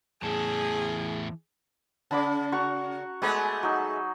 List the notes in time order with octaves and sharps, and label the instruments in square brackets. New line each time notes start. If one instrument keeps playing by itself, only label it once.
[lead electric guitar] E2 A2 [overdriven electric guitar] E3 A5 [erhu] G#4
[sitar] C#3 [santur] A5 B5 D6
[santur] F#4 A#5 C#6
[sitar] G#3 A3 B3 [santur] D5 G#5 B5
[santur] F#3 D#4